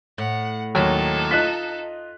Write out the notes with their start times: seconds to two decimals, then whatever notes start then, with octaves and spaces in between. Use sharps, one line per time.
0.18 A2 F#5
0.75 D#2 F#3 D#4 A4
1.31 F4 D#5 F#6 B6